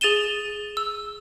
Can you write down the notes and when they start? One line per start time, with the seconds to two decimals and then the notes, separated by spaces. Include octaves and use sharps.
0.01 G#4 A6 D#7 E7 G7
0.77 E6